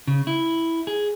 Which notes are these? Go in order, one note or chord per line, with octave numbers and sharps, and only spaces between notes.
C#3
E4
G#4